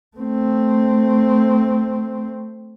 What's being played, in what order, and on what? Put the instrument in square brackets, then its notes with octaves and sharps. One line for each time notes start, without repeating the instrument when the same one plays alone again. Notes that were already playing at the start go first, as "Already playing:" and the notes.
[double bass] A3 C4